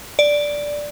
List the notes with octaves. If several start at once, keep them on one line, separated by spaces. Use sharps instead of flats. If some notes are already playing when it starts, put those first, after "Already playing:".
D5